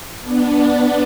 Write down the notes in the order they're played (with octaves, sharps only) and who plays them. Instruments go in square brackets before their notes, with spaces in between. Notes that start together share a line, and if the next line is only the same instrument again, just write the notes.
[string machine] B3 D4